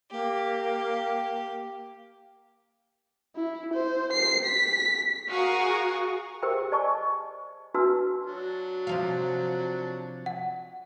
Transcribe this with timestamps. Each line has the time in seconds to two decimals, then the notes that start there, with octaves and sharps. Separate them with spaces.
0.11 A#3 G4
3.36 E4
3.74 C5
4.13 C7
4.46 B6
5.30 F#4 G#4 A#4 F5 C#6 D#6
6.42 G4 G#4 A#4 C5 E5 G5
6.72 C5 D5 D#5 G#5 A5 C#6
7.74 D4 F#4 B4 E5 A5 E6
8.25 F#3 D4
8.87 C3 F3 F5
10.26 F#5